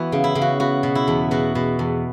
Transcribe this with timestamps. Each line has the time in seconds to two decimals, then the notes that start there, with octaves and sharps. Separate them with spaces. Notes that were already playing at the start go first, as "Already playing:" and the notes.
Already playing: E3 B3 F#4
0.12 C#3
0.24 E4
0.35 C#3
0.41 F#4
0.60 B3 F#4
0.83 B2
0.95 E4
1.08 E2
1.31 B2 F#4
1.55 B2
1.79 E2